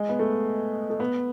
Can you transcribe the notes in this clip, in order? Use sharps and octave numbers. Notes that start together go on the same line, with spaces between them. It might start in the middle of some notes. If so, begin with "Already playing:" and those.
Already playing: G#3
B3
A3
A3
B3